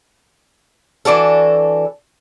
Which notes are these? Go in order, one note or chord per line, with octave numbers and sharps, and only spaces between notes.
E3 D4 F#4 A4